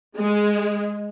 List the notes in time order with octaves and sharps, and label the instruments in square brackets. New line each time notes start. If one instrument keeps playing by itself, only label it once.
[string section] G#3